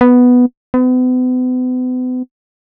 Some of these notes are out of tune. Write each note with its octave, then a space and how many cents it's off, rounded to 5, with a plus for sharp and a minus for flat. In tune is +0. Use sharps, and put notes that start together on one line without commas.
B3 +0
B3 +40